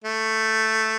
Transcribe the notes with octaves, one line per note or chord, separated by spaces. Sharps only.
A3